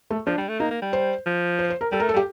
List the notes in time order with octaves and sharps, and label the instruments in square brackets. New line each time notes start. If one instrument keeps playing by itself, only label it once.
[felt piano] A3
[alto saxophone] F3 [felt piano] D4
[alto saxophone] G3
A3
[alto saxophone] A#3 [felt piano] D#4
[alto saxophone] A#3
G3
[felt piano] C5
[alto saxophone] F3
[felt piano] C5
C5
A#4
[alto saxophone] G3 [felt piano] A4
[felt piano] A#4
[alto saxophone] A3
[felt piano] A4
[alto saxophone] G3
[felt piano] G4